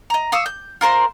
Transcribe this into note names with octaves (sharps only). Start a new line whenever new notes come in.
D#5 A#5
F5 C#6 D#6 E6
G6
F4 A#4 C5 C6